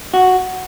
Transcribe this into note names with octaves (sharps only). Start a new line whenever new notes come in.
F#4